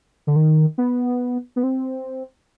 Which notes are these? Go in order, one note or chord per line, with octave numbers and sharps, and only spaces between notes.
D3
D#3
B3
B3
C4